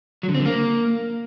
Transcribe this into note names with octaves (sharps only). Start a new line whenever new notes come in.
F#3
D3
C4
D3
A#3